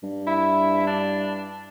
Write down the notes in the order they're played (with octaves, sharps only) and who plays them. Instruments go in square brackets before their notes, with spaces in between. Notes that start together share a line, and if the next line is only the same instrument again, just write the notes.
[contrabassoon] G2
[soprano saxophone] E4
D4